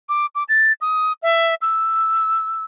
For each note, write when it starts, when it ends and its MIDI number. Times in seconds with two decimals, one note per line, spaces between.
0.09 0.26 86
0.35 0.44 86
0.49 0.73 93
0.81 1.13 87
1.23 1.54 76
1.62 2.64 88